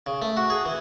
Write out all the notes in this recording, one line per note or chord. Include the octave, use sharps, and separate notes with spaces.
C#3
A3
F#4
G#4
E3